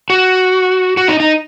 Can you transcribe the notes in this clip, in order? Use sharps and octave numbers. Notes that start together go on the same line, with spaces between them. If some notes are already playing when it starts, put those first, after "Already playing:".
F#4
F#4
D#4
D#4